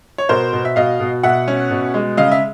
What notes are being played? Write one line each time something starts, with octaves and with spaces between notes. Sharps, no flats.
C#5
B2 A#4 C5
B2
E5
B2 D#5 F5
B2
B2 E5 F#5
C#4
B2
G#3
C#3 D#5 F5
E5